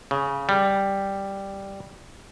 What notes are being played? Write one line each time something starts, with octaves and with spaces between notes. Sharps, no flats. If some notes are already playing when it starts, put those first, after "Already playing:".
C#3
G3